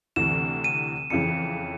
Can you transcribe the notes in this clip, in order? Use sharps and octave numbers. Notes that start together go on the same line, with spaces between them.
D2 C3 E3 E7
D#7
F2 C#3 E3 C#7